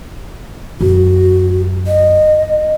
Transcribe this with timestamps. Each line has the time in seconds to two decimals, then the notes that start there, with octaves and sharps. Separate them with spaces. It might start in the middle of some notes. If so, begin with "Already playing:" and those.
0.81 F#2 F#4
1.87 D#5